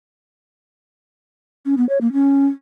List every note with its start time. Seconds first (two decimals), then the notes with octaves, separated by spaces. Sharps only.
1.66 C#4
1.77 B3
1.89 C#5
2.01 A#3
2.13 C#4